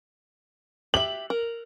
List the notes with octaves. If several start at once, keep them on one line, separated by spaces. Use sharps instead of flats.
G4 E5 F#7
A#4